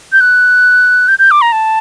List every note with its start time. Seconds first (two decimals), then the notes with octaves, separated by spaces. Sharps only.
0.12 G6
0.21 F#6
1.08 G6
1.19 G6
1.31 D6
1.42 A#5
1.52 A5